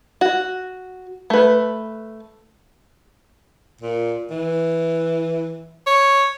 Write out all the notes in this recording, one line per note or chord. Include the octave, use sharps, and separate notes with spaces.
F#4
A3 B4
A#2
E3
C#5